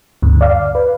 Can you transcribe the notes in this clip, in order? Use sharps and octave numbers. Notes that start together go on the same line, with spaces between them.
D2 G2
D5 F5
B4